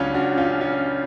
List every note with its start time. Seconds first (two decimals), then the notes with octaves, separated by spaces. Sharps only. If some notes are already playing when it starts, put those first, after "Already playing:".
Already playing: C#2 C#3 F#3 C#4 D4 F4
0.14 D4 F#4
0.38 C#4 F4
0.61 C#4 F4